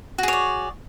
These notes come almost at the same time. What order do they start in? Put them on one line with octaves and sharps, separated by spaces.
F#4 G#4 C#5 D5